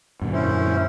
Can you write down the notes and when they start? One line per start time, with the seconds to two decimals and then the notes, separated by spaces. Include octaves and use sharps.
0.21 F#2 A#2 D3
0.33 C#4 E4 C5